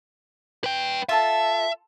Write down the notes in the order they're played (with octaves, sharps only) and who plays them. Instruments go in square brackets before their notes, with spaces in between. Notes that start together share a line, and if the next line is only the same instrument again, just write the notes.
[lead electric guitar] B4 G5
[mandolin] F4 A4 A5 [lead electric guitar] E5